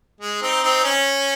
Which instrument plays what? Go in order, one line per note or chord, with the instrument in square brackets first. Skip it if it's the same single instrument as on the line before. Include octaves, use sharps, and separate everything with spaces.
[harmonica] G#3
C4 D#4
C4 D#4
C#4